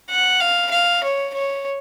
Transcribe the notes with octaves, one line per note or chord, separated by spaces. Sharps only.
F#5
F5
F5
C#5
C#5